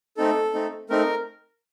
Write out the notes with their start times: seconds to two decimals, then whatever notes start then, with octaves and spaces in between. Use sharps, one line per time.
0.17 A3 C4 D#4 A4
0.54 A3 C4 D#4
0.90 A3 C4 D#4 A#4